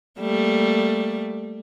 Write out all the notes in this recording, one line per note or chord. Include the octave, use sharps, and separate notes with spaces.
G3 A3 A#3